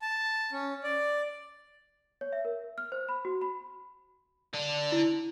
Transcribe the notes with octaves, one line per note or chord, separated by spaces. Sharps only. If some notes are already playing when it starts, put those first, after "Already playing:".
A5
C#4
D5
C#5
E5
A#4
F6
C5
B5
F#4
B5
D3 D4
E4